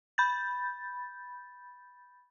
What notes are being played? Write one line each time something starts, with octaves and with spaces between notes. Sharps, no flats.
B5 G6 A6